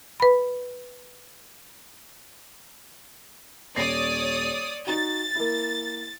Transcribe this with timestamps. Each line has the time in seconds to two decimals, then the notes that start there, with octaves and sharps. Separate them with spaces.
0.20 B4 B5
3.76 D#1 C#5 D5 D#6 A#6 C7
4.87 D#4 F#4 A6
5.35 A#3 E4